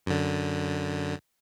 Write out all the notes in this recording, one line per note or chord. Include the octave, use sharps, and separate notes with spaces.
F#2 D3